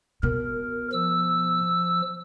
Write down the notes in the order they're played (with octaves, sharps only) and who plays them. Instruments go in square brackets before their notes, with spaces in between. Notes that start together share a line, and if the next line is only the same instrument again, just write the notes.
[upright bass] B2 [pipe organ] A#4
[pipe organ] F3 E6